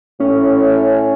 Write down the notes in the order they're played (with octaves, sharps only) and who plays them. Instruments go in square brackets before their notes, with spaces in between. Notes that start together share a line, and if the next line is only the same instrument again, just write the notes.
[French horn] A2 [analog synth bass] C#4